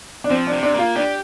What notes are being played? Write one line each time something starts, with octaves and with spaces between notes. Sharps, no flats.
D4
F3 C4
D4
C3
D4
A#3 F4
D4 G4